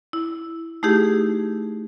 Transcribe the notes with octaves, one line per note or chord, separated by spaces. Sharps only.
E4
A3 D#4 E4 G4 G#4